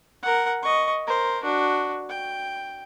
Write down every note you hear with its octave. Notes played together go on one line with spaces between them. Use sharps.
A#4 F#5
D#5 C#6
A#4 C5
D4 F#4
G5